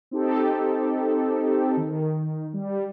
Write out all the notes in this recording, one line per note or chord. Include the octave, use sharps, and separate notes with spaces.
C4 D#4 G4 A4
D#3
G3